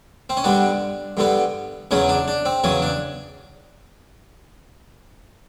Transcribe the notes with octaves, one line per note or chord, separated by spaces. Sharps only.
C4
C#4
G2 D3 G3 B3 D4
G2 D3 G3 B3
E2 C#3 F#3 C#4
D4
D4
C4
E2 C#3 F#3 C#4
D4